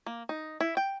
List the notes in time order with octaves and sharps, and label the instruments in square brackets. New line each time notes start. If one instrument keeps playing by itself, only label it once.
[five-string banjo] A#3
D#4
E4
G5